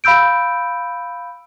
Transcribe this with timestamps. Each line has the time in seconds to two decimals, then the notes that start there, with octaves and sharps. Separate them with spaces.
0.04 F5 B5 E6 G6 D7